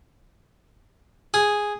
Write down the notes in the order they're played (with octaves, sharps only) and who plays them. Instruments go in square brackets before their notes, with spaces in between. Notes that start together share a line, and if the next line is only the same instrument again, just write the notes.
[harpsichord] G#4